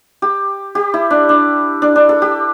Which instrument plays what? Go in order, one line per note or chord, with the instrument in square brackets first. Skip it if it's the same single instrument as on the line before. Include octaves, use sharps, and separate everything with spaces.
[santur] G4
G4
E4
D4
D4
D4
D4
A4
G4